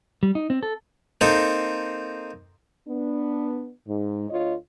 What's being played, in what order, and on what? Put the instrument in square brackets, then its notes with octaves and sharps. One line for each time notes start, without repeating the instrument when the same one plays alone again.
[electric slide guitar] G3
D#4
C4
A4
[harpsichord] A#3 C4 D#4 A4
[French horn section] B3 D4
G#2
D2 F4 C#5 D#5